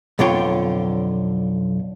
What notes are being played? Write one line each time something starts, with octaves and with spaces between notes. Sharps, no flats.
B1 F2 D3 F4 C#5 G5